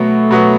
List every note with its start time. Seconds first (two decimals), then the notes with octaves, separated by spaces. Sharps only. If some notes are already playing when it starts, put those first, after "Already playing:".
Already playing: B2 F#3 A3 B3
0.31 B2 F#3 B3